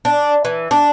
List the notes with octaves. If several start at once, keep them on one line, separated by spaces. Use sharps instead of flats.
D4
E3
D4